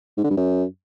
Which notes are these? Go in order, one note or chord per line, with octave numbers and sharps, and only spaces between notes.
G#2
D3
G2
F#2